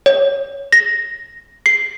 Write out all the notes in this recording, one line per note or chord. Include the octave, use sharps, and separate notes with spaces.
C#5
A#6
C7